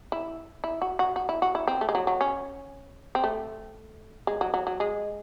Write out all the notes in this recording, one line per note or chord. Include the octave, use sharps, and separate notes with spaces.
E4
E4
F#4
F#4
F#4
E4
F#4
E4
C4
A3
G#3
F#3
F#3
C#4
C4
A3
G#3
F#3
F#3
F#3
G#3